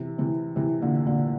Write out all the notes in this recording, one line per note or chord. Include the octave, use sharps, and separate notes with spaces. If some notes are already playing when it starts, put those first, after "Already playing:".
Already playing: C3 E3
C3 E3
C3 E3
A#2 D3
A#2 D3